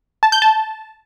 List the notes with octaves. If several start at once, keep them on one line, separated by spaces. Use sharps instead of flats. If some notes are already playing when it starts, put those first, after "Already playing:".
A5
G6
A5